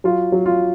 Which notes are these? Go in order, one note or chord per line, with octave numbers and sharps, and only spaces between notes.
F#3 F4
F#3
F4